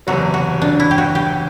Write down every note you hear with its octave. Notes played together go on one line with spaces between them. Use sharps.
F#1 E2 C3 F#3 F#4
F#4
D4
E4
G4
F#4
G4